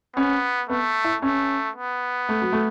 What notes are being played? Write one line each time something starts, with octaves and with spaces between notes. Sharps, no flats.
B3 C#4
A3 B3
E4
A3 C#4
B3
A3
F#3
A3